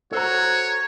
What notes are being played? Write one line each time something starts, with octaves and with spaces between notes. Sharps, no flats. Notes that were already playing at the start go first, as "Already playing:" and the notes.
F#4 A4 C5 C#5 A#5